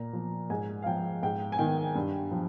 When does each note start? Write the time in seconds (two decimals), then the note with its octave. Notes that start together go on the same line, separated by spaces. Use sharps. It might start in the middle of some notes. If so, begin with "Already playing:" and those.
Already playing: A#2 A#5
0.13 F3
0.50 G#2 G#5
0.83 F5
0.86 F3 G5
1.23 G#2 G5
1.52 G#5
1.58 D#3 G5
1.95 G2
2.31 F3